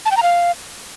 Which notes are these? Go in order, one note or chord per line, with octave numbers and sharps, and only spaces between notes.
A5
G5
A#5
F5